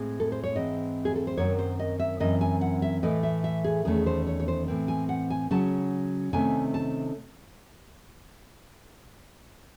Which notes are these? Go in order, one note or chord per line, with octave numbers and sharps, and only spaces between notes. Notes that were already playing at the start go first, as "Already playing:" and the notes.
Already playing: A2 G#3 C4
A4
C5
C#5
G#2 E3 C4 D#5
G#4
A4
C5
F#2 D#3 F#3 C4 C#5
C5
D#5
E5
F#2 E3 C4 D#5
G#5
F#5
E5
A2 E3 A3 D#5
E5
E5
G#4
E2 D#3 A3 C#4 G#4
C5
C#5
C#5
C5
A2 E3 C4
G#5
F#5
G#5
C#3 F#3 C#4 A5
C3 D#3 A3 C#4 G#5
A5